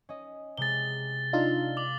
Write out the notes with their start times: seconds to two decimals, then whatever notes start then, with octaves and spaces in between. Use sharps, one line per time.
0.09 C#4 D#5
0.58 C3 G#3 A6 G7
1.33 D4 D#4 F4 F5 E6 E7
1.77 D6 F#7